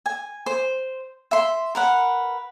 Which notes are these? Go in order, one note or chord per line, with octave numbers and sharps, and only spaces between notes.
G#5
C5
E5 C6
A#4 B4 F#5